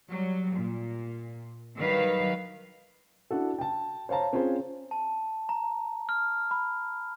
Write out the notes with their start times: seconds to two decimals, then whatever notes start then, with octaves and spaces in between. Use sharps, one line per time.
0.10 F#3 G3
0.56 A#2
1.77 D#3 F#3 G3 B4 F5
3.31 D4 E4 F#4 A4
3.59 G5 A5
4.09 C5 C#5 F5 A5 A#5
4.33 C4 C#4 F4 G#4 C5
4.91 A5
5.49 A#5
6.09 F6
6.51 B5